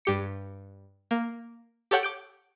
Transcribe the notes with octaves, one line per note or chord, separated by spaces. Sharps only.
G2 G4 C#7
A#3
G4 A4 C#5 F#5 G5
D6 G6 D7